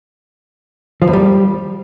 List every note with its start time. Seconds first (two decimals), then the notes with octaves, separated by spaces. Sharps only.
1.02 F3
1.07 E2
1.13 G3